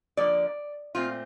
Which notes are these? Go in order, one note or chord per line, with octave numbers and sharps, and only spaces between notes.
D3 F3 A#3 D5
A#2 A3 C4 F4